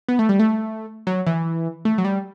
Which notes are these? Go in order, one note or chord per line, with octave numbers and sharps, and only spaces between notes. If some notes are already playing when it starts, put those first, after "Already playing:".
B3
A3
G3
A3
F#3
E3
A3
F#3
G3